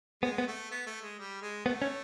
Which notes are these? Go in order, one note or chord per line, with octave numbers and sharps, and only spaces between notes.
G#3 B3
B3
A3
B3
A3
G#3
G3
G#3
A3 B3
C#4